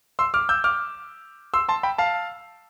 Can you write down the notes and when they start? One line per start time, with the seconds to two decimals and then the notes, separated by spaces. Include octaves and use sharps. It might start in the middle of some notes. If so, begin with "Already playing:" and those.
0.19 C6 E6
0.34 D6 F6
0.49 E6 G6
0.64 D6 F6
1.54 C6 E6
1.69 A5 C6
1.83 G5 B5
1.98 F5 A5